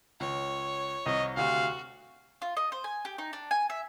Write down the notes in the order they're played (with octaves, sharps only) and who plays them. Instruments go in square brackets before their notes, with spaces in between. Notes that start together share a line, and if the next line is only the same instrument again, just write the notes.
[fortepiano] C#2 [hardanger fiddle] C#5
[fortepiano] C2 [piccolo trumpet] D#5
[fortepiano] D2 C3 [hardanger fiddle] F#4 [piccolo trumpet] F5
[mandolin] F4
D#5
C5
G#5
G4
D#4
D4
G#5
E5